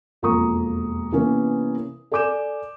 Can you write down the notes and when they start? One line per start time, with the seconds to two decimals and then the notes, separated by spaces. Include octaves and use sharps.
0.22 E1 F2 A#3 A#5 C#6 D#6
1.12 C3 E3 A#3 B3 C#4 A#4
2.12 A4 D5 G#5 D6 G6 E7